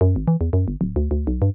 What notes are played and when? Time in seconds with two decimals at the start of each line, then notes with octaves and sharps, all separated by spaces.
0.01 F#2
0.16 G#1
0.28 E3
0.41 E2
0.53 F#2
0.68 G1
0.81 D1
0.96 D2
1.11 D2
1.27 B1
1.42 G2